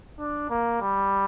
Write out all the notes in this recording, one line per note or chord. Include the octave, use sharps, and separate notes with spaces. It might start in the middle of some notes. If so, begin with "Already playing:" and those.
D4
A#3
G3